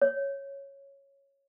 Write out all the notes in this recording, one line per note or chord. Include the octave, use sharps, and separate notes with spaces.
C#5